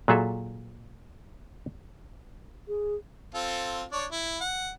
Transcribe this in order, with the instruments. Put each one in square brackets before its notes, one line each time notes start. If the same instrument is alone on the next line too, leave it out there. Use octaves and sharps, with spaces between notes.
[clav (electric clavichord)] A#2 F#3 G#4 A4 E5
[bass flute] G#4
[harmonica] C4 F4 A4
D4 C#5
E4
F#5